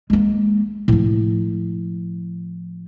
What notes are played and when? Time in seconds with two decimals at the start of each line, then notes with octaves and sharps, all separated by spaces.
0.10 G#3 A#3
0.88 A2 F3